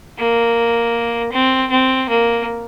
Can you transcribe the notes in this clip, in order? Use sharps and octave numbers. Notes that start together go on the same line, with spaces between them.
A#3
C4
C4
A#3